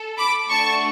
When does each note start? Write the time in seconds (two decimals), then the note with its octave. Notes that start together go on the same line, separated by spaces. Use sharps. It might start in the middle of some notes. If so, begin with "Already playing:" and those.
Already playing: A4
0.18 B5 D6
0.50 A3 D4 F#4 A4 A5 C#6